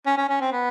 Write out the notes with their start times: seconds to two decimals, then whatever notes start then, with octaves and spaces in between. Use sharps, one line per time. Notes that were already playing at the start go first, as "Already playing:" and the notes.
0.06 C#4
0.18 C#4
0.29 C#4
0.41 C4
0.52 B3